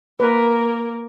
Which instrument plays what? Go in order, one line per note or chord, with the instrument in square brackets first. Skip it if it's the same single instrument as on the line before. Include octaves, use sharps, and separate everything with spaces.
[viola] A#3 A#4 [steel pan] B4